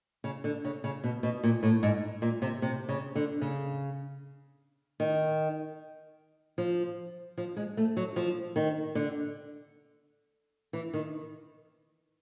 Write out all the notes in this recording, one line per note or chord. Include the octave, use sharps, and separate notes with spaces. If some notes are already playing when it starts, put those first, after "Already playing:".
C#3
D3
C#3
C#3
B2
B2
A#2
A2
G#2
A#2
C3
C3
C#3
D3
C#3
D#3
F3
F3
G#3
A3
F#3
F3
D#3
D3
E3
D#3